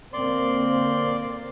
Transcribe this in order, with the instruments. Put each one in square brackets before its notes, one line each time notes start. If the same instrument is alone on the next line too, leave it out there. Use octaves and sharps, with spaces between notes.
[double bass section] D3 A#3 C4 [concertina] D5 C6